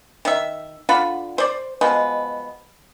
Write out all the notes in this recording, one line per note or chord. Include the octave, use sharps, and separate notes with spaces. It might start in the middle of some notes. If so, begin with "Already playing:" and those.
D#3 E5
D3 F4 F#5 B5
C5 D5
B2 F3 G#3 B3